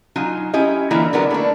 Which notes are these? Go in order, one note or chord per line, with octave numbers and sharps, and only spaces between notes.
F#3 D#4 F4 G#5
C#4 E4 G4 D#5
D3 E3 A#3 E4 F4
D3 F#3 B3 D4 A#4
A3 A#3 D4